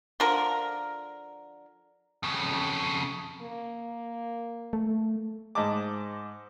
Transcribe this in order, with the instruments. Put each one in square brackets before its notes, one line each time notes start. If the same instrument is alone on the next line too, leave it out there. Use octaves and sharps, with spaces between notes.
[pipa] D3 F3 A#4
[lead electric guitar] F2 C#3
[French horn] A#3
[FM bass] A3
[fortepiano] G#2 D#5 A5 D6